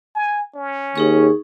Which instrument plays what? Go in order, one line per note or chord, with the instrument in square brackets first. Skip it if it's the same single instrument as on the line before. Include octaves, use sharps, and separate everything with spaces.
[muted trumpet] G#5
C#4
[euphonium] D#2 [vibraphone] D#4 G#4 C#6